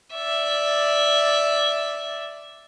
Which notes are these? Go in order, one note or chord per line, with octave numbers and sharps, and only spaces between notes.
D5 E5